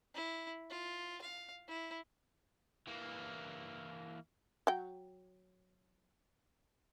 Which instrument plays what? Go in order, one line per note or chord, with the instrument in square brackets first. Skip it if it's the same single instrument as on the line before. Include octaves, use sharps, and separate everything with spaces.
[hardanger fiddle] E4
F4
F5
E4
[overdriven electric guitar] E3 A#3
[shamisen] F#3 G5